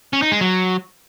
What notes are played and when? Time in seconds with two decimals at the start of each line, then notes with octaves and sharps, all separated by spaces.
0.13 C#4
0.22 D#4
0.32 G#3
0.41 F#3